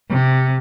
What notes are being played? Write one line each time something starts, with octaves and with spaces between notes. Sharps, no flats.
C3